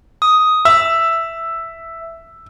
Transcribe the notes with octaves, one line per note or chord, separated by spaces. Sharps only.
D#6
E5 E6